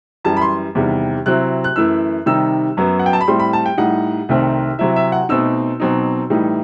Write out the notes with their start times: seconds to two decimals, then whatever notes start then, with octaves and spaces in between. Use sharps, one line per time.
0.25 F#2 E3 G3 A5
0.37 B5
0.42 C6
0.75 E2 C3 D#3 G3
1.26 C3 F#3 C4 E4 F#6
1.64 F#6
1.76 F#2 E3 A3 E4 E6
2.26 C3 D#3 G3 D#4 E6
2.77 F#2 F#3 B3
2.99 F#5
3.06 G5
3.13 A5
3.21 B5
3.28 A2 G3 C4 C6
3.40 B5
3.53 A5
3.66 G5
3.78 A2 G3 D#4 F#5
4.29 C2 C3 D#3 A3 C4
4.79 C3 F#3 C4 E4 E5
4.96 E5
5.12 F#5
5.29 B2 A3 C4 D#4 E6
5.80 B2 F#3 C4 D#4
6.30 A2 E3 G3 D#4